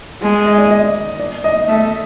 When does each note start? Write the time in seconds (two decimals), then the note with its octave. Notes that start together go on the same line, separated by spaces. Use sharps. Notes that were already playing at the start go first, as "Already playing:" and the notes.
0.22 G#3
0.46 D#5
0.58 D5
0.70 D#5
1.19 D5
1.44 D#5
1.68 A3 E5